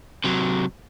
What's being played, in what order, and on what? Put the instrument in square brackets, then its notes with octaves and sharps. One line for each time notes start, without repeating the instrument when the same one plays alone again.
[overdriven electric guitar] C3 F#3